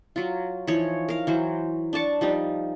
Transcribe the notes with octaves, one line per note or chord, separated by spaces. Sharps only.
F#3 F4
E3 F3 D#4 C#5
A#4 F5
E3 F#3 C5
D4 D5 A5 C#6
F3 G3 D#4